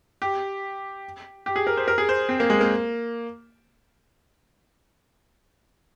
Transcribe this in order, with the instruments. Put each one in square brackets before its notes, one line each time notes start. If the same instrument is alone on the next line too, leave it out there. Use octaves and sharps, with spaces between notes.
[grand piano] G4
G4
G#4
A#4
C5
A#4
G#4
C5
C4
A#3
G#3
A#3